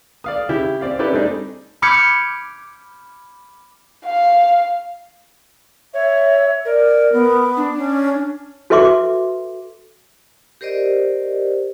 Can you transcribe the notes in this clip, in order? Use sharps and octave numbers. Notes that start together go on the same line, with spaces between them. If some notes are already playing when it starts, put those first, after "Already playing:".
D5 F5 D#6
C#3 E4 G4
C4 D5 F5
C#4 E4 G4 A4 B4 D5
G3 A3 C4 D4 D#4 G#4
B5 D6 F6 G6 G#6 C#7
F5
C#5 E5
A#4 D5
B3
D4
C#4
F#4 A4 B4 E5 C6 D6
G4 A#4 C5 D5 D#5